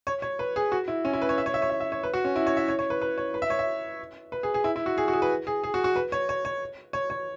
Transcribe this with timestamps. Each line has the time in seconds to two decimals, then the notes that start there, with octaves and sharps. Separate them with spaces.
0.07 C#5
0.22 C#5
0.39 B4
0.56 G#4
0.72 F#4
0.88 E4
1.05 C#4
1.13 E4
1.22 B4
1.29 C#5
1.38 E5
1.46 C#5
1.54 E5
1.62 C#5
1.70 E5
1.80 E5
1.92 C#5
2.03 B4
2.14 F#4
2.25 C#4
2.36 E4
2.47 C#5
2.57 E5
2.68 C#5
2.79 C#5
2.90 B4
3.02 B4
3.18 C#5
3.34 B4
3.42 E5
3.50 C#5
3.59 E5
4.32 B4
4.43 G#4
4.54 G#4
4.64 E4
4.76 E4
4.86 F#4
4.98 G#4
5.08 F#4
5.13 G#4
5.22 B4
5.47 G#4
5.64 G#4
5.74 F#4
5.84 F#4
5.96 B4
6.12 C#5
6.29 C#5
6.45 C#5
6.93 C#5
7.10 C#5